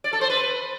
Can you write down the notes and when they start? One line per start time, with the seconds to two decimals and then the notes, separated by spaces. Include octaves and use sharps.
0.04 D5
0.13 A4
0.21 C5
0.30 B4